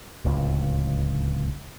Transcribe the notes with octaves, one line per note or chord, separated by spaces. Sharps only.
D1 C#2